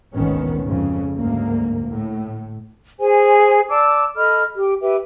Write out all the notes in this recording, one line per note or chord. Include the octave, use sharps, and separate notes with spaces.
G#1 D2 B2 D#3 B3 C#4
F2 G#2 C#3
D2 G#2 A#3
A2
G#4 C5 G#5
D5 A5 D6 E6
A4 D#5 B5 F6
G4
G4 B4 E5